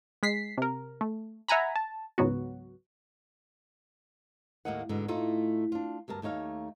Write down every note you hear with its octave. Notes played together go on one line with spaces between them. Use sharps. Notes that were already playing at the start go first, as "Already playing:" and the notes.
G#3 B6 C7
C3 A#4
A3
E5 F#5 G#5 A#5 B5
A5
C#2 G#2 F#3 B3 F#4
D#2 A2 G#3 A#3 D#5 F#5
G#2 B2 D3
A2 A3 D#4 F4
D4 F4
D2 G2 A#4 A5
D#2 A3 D#4 C#5 F5